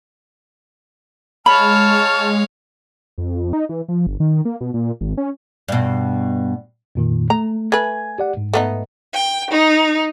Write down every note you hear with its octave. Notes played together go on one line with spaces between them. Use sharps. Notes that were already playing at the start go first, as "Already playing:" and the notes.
G#3 C#5 F5 A5 B5 C#6 F6
F2
D#4
E3
F3
G1
D#3
A#3
B2
A#2
G#1
C#4
G2 B2
F2 A#2 D#3
A3 A#5
A3 B4 G#5 G#6
G4 D5 F#5
G#2
A3 B3 D#4
G5
D#4